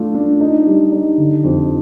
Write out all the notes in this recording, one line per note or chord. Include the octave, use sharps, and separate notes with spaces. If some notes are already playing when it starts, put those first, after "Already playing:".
Already playing: A3 D4 F4
D4
D#4
G3
D#4
D3
F2